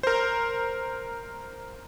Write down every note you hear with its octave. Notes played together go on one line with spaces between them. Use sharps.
A#4 C5